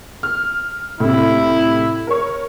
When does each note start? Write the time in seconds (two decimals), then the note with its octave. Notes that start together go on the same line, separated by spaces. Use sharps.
0.23 F6
1.00 A2 C3 E4
2.07 A#4 C#5